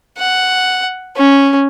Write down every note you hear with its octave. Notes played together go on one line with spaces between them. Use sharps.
F#5
C#4